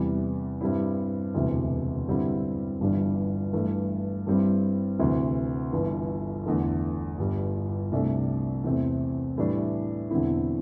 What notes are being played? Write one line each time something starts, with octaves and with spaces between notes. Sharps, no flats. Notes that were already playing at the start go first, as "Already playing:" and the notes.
Already playing: E2 C3 E3 G3
G2 G3 C4 E4
E1 D2 C3 E3
G2 D3 G3 C4 E4
G1 G2 E3 G3 D4
G2 E3 A3
G2 G3 C4 E4
D2 C3 E3
G1 G2 E3
E2 D3 A3
G1 G2 G3
C2 C3 A3 D4
E2 C3 A3 C4
A2 E3 G3 D4
E1 E2 D3 C4 E4